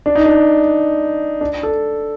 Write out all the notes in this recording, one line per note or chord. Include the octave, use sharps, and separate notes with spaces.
D4
D#4
D4
D4
A4